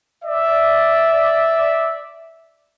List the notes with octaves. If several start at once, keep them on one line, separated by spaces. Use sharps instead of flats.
D5 E5